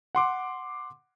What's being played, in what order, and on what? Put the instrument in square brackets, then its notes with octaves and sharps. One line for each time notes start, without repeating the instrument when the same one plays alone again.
[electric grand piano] F#5 C6 D6